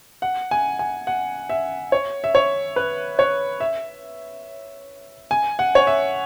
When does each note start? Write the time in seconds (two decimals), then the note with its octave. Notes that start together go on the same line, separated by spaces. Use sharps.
0.22 F#5
0.51 G#5
0.79 G#5
1.07 F#5
1.50 E5
1.92 C#5
2.24 E5
2.35 C#5
2.76 B4
3.19 C#5
3.60 E5
5.31 G#5
5.59 F#5
5.75 C#5
5.87 E5